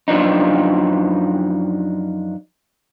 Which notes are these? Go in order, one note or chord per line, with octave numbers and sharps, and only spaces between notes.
F#2 F3 D4 D#4